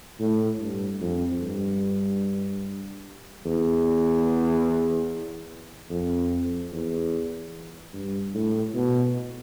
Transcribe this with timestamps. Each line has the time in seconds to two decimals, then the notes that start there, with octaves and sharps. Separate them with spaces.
0.20 A2
0.60 G2
1.01 F2
1.42 G2
3.45 E2
5.90 F2
6.71 E2
7.94 G2
8.34 A2
8.75 B2